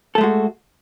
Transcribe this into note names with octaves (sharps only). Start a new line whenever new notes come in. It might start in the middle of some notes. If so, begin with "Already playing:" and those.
G#3 A3 F#4 A4